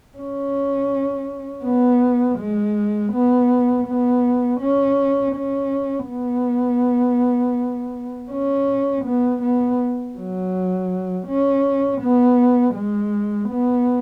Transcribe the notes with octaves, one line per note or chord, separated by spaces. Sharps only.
C#4
B3
G#3
B3
B3
C#4
C#4
B3
C#4
B3
B3
F#3
C#4
B3
G#3
B3